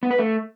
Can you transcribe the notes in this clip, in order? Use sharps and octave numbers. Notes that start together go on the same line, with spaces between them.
B3
B4
A3